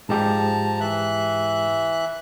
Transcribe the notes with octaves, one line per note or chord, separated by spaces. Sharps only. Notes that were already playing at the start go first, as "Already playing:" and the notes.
G#2 F3 G#3 G4 A5 A#5
E3 E5 F#6